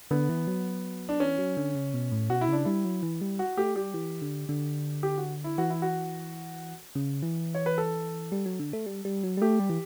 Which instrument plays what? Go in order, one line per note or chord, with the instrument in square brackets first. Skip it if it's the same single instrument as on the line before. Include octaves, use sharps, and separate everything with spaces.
[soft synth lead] D3 [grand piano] B3
[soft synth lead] E3
F#3
[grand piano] D4
[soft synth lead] E3 [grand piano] C#4
[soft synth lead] F#3
D3
C#3
B2
A2
[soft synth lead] B2 [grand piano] F#4
[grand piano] E4
[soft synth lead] C#3 [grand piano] D4
[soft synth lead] G3 [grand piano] E4
[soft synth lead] F#3
E3
G3
[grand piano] F#4
[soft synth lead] A3 [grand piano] G4
[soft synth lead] G3 [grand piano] G4
[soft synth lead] E3
D3
D3
[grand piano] G4
F#4
E4
[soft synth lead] E3 [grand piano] F#4
[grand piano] E4
F#4
[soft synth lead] C#3
E3
[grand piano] C#5
B4
A4
[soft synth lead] G3
F#3
D3
A3
G3
G3
F#3
G3
[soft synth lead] A3 [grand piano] G4
[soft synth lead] G3
E3